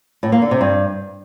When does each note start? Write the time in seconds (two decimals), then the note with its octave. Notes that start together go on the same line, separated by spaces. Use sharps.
0.23 A2
0.32 A#3
0.42 D3
0.51 C3
0.61 G2